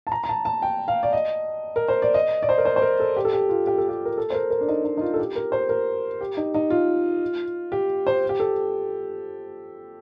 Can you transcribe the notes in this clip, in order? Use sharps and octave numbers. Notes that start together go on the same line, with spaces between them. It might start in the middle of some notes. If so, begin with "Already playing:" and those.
A5
A#5
A#5
A5
A5
G5
F5
D5
D#5
A#4
C5
D5
D#5
D5
C5
A#4
C5
C5
A#4
A4
G4
A4
G4
F4
G4
A4
G4
A#4
A4
C5
A#4
A#4
D4
D#4
D#4
D#4
F4
A4
G4
A#4
C5
A#4
G4
D#4
D#4
F4
G4
C5
G4
A4